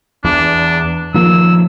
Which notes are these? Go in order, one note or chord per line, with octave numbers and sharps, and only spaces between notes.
E2 D4
D#3 F3 A#3 E6